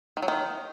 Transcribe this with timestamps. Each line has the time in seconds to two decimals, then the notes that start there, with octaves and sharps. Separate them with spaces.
0.17 D#3
0.22 F#3
0.28 D#3